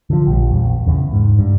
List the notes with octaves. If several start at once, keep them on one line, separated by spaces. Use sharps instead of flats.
D3 F3
A#1 G3
A#1 E2
E2 C#3
G#2
G2